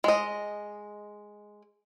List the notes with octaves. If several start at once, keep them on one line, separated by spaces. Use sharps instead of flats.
G#3 D#5